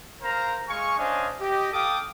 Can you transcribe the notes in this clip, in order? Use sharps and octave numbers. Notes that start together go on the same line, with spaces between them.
A#4 C5 F5 A#5
G#3 F5 G#5 C#6
C#4 D4 C5 D#5 F5 G#5
G4 D#5
A4 F5 G5 D6 D#6